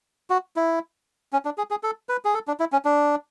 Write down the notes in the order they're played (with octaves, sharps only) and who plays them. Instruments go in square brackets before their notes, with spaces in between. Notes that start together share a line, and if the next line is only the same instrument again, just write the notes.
[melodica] F#4
E4
C#4
D4
G#4
G#4
A4
B4
G#4
A4
D4
E4
C#4
D4